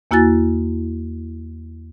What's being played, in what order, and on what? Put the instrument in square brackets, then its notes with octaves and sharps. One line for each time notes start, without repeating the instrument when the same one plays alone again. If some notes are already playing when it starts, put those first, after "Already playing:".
[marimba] E2 A#3 E4 F#4 G#5 A6